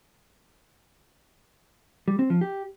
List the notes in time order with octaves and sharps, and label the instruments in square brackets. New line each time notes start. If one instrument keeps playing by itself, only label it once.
[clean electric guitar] G3
C4
F3
G4